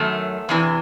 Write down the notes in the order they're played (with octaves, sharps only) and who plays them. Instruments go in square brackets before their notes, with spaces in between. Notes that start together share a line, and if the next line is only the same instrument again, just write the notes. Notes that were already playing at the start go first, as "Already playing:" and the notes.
Already playing: [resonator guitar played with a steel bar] F#2 D#3 F#3 A3
E2 C3 E3